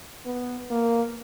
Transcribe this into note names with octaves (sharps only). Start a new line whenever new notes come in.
B3
A#3